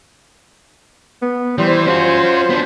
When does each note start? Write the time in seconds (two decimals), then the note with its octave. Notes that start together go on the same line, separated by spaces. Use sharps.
1.22 B3
1.58 E3 G3 C5
1.87 C#4 F4 F#4
2.50 B3 D4